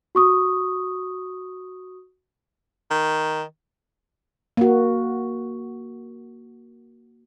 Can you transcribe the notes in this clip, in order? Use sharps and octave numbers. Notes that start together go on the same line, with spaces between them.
F#4 C#6 D#6
D#3
A#3 F#4